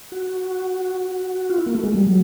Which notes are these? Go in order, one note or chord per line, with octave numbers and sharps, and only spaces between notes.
F#4
F4
E4
A#3
A3
G#3
G3
F#3